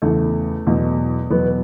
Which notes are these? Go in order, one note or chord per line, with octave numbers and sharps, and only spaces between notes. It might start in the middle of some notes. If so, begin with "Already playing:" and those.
E2 C#3 E3 A3
E2 B2 F#3
E2 B2 F#3 B3